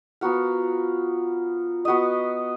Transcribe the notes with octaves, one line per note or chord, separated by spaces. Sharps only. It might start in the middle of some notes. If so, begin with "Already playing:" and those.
F3 B3 F#4 A#4
B3 F#4 B4 D#5